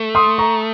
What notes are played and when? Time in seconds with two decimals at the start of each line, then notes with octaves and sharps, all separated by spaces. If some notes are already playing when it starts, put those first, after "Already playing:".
Already playing: A3
0.15 C6 D#6
0.38 A#5 C#6